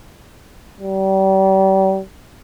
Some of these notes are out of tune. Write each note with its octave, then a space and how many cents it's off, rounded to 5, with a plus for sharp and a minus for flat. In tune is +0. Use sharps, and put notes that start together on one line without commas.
G3 -35